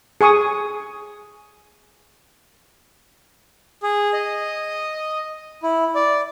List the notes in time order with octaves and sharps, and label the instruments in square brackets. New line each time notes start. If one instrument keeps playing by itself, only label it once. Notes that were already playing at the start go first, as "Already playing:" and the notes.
[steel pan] G#4 G#5 C#6 D#6
[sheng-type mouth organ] G#4
D#5
E4
D5